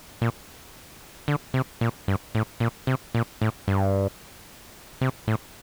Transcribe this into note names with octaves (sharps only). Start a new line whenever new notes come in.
A#2
D3
C3
A#2
G2
A2
A#2
C3
A#2
A2
G2
C3
A2